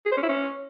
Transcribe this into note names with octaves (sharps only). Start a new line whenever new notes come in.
G#4
C5
C#4
E4
C#4